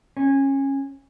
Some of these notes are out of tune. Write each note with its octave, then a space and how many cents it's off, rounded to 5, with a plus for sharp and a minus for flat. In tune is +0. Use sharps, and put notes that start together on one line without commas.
C#4 -20